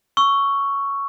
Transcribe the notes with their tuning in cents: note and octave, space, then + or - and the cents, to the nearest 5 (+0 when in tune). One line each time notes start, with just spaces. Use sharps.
C#6 +5 E6 +15